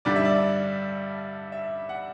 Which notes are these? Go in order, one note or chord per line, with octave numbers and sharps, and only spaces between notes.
G2 D3 G3 D5
E5
D5
E5
F#5